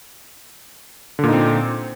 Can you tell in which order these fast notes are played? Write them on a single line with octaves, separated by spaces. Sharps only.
D3 A#2 D#4 C4